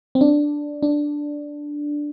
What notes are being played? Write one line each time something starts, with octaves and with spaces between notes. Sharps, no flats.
C4
D4
D4